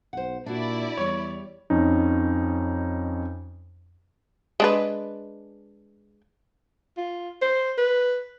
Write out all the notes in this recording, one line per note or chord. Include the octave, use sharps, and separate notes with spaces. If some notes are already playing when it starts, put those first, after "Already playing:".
B1 C5 F#5
A#2 D4 E4 F#4 D5
E2 G3 C#5
F2 C#4 D#4
G#3 D4 B4
F4
C5
B4